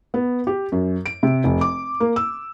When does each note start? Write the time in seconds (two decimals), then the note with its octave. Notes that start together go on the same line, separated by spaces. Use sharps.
0.14 B3
0.47 G4
0.72 F#2
1.06 D7
1.23 C3
1.44 F1
1.61 D6
2.00 A#3
2.16 E6